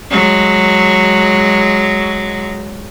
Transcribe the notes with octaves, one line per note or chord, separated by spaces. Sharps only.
F#3 G#3